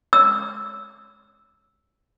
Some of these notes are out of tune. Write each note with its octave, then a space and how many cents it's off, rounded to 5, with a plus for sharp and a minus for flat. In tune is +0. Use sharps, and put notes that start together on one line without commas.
E6 +0